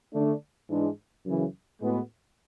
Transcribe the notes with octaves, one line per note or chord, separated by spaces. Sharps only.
D3 A3 D4
G#2 E3 G#3 D4
F#2 C#3 E3
A2 G#3 B3 F#4